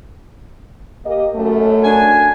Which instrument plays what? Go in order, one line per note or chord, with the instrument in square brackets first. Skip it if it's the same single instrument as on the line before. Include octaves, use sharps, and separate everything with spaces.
[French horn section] A#3 G4 D#5
F#2 A3
[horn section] D4 G#5